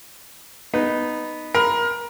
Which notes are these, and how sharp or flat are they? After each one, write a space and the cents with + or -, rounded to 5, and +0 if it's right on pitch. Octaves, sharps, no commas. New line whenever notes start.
B3 +0 D#4 -10
A#4 +25 B5 +25